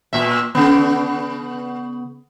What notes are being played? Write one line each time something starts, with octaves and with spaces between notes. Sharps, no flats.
A#2 E5
C#3 B3